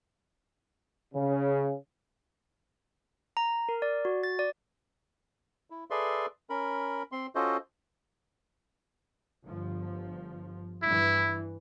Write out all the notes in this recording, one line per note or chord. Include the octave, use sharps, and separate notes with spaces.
C#3
A#5
A#4
D5
F#4
A6
D5
E4
G#4 A4 B4 D5 E5 C6
C#4 A#4 B5
C4 C6
C#4 F4 F#4 A4 C5 D#5
G1 F3
G2 E3 E4